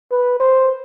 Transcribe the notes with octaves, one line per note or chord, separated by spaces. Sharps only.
B4
C5